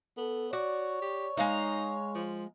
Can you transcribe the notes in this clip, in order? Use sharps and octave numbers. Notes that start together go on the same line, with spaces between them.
B3 A4
F#4 C#5 D5
G4
G#3 D#4 F5 A#5
F3